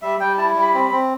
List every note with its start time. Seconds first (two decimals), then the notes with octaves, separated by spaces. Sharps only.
0.02 G3 E5
0.20 G3 G5
0.37 E4 A5
0.56 G3
0.62 B5
0.74 C4
0.91 C4